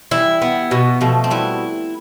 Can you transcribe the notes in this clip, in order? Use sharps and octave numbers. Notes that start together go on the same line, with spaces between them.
E3 G3 E4
B3
B2
B2 F3 A3
C4
G3 B3 E4